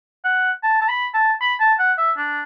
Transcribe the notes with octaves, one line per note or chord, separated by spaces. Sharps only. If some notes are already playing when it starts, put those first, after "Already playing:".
F#5
A5
A5
B5
A5
B5
A5
F#5
E5
D4